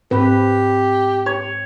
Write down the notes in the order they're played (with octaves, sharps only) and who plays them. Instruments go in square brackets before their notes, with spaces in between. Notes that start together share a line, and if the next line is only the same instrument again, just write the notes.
[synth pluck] G#2 C4 [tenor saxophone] G4 [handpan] B4
[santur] C#5